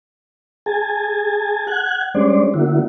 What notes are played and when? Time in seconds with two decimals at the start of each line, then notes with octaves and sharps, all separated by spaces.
0.66 G#4 G#5 A5
1.67 F#5 F#6 G#6
2.14 G3 G#3 C#4 D4 C5 D5
2.54 D3 A#3 E4 F#4